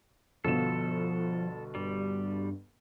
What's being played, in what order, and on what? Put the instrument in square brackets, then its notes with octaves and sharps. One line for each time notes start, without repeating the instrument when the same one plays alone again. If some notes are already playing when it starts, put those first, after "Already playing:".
[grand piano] G1 B2 E7 [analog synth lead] F3 [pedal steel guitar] A4
[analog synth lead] G2 [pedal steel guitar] G3